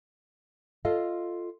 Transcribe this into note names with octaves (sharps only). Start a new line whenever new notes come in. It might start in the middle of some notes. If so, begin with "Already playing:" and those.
F4 A4 D#5 F5